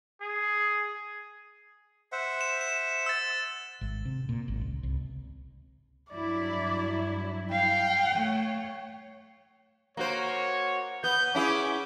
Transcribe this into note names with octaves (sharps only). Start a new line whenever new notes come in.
G#4
C5 E5 F#5
E7
E7
E6 A6
G#1
C3
A#2
G#1
C#2
C2
G2 F#3 E4 D5
F5 G5
A3 C#5
A#3 F#4 C5 C#5
B3 G6
C#4 E4 G#4 D6